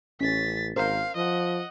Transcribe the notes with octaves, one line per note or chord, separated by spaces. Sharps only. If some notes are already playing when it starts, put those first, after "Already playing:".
A1 C#4 A6 B6
G#1 A#4 C5 F5
F3 D#5 F#5